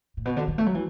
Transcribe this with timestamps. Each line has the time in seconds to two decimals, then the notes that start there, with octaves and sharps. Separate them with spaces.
0.17 A2
0.25 B2
0.37 D3
0.48 F#3
0.58 A3
0.66 F#3
0.75 E3